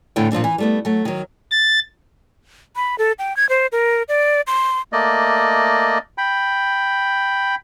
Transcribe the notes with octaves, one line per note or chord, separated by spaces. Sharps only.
E2 A2 D3 E4 G5
A#2 F3 C4 D4
E3
G3 A3 B3
F#3 A3
D#3 F#3
A6
B5
A4
G5
G#6
C5
A#4
D5
C6
A3 A#3 D5 D#5
G5 B5